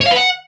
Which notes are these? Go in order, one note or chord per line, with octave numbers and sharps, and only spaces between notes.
C#5
F5
B4
F#5